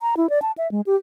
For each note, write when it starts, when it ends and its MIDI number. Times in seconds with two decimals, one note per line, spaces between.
0.01 0.15 82
0.17 0.30 64
0.30 0.41 74
0.42 0.52 81
0.58 0.70 76
0.71 0.81 56
0.86 0.96 67